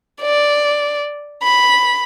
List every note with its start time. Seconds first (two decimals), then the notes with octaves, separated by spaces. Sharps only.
0.22 D5
1.43 B5